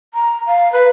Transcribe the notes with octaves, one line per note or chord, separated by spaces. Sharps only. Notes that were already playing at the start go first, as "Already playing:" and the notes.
A#5
F5
B4